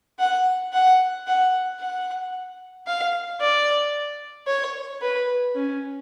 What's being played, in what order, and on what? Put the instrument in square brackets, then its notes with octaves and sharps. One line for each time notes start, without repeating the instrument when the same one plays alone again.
[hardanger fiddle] F#5
F#5
F#5
F#5
F5
D5
C#5
B4
C#4